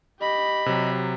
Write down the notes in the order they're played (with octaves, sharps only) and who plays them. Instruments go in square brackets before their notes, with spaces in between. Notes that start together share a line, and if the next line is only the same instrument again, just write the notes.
[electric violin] G4 B5 [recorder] D#5
[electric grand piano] C3 F#3